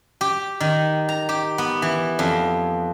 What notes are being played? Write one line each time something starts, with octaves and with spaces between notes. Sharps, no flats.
G4
D#3
A#5
G4
B3
E3
F2